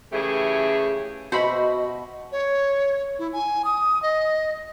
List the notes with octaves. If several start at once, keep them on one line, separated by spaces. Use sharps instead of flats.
A2 C#3 E3 A3 G4 G#4
B2 F#4 C5 D#5 E5 B5
C#5
E4
G#5
D#6
D#5